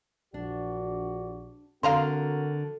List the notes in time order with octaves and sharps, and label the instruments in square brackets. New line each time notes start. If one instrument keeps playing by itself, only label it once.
[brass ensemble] A#1 F#4 D5 [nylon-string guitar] D4
[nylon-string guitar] D3 [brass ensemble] C4 F#4 A#4 [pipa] F5 A#5 C6